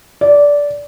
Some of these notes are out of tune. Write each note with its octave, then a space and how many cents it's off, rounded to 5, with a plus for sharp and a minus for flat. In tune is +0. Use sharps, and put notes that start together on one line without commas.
D5 -15